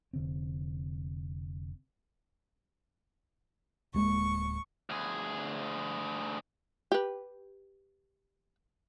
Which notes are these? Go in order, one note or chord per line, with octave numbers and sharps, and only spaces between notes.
F1 D3 C4
D1 G#3 A#3 C#6
D2 G#4
G4 B4